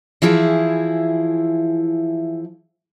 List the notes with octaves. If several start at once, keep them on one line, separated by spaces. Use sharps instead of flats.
E3 F3 E4 G#4